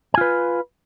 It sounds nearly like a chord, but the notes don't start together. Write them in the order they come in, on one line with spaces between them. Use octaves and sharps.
G#5 F4 B4